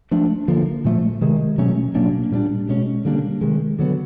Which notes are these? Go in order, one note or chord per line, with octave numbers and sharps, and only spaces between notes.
F3 A3 D4
D3 F3 A#3
A#2 F3 A3
C3 D#3 G#3
B2 F#3 A3 C#4
B2 F#3 A#3 D4
A#2 G3 B3 D4
B2 G#3 C#4
D3 G3 A#3 D4
C3 D#3 G#3
D3 F#3 B3